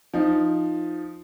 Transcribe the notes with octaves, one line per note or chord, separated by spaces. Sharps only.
F3 D#4